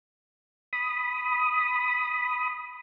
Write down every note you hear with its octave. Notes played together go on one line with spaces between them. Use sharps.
B5 D#6